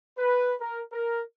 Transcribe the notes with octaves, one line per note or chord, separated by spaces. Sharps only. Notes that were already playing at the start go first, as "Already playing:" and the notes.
B4
A#4
A#4